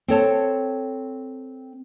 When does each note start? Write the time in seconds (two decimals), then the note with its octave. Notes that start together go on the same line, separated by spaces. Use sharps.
0.08 C4 A4 C#5 A5